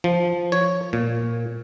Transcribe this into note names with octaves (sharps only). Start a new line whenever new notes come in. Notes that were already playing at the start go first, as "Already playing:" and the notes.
F3
C#5
A#2